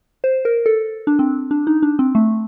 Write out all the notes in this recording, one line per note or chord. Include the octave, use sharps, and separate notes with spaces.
C5
A#4
A4
D4
C4
D4
D#4
D4
C4
A3